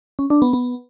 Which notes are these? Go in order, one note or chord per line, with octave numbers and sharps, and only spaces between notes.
C#4
D4
B3
B3